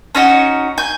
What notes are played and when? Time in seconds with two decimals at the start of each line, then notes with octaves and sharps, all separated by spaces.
0.15 C#4 D#4 F#4
0.78 G#5 G6